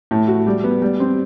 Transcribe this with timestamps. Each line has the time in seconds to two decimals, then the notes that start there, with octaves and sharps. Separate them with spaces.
0.11 A2
0.28 F#4
0.47 G3
0.64 B3
0.82 G3
1.00 C4